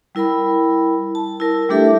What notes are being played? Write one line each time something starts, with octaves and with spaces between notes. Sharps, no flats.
G3 E4 A#4 G5 B5
A5
E4 A#4
G3 A3 D4 G4 A4 E5